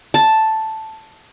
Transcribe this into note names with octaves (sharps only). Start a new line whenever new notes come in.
A5